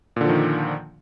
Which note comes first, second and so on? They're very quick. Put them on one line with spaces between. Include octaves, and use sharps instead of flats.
A#2 D3 F3 D#3